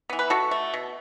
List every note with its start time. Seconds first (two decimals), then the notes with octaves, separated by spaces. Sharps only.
0.10 E3 B3
0.19 B4
0.30 B2 F#4 A4
0.51 A3
0.74 B2